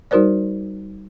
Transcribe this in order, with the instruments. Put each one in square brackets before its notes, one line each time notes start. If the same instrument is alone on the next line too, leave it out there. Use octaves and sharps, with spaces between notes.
[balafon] G3 D#4 F#4 A#4 C5 D5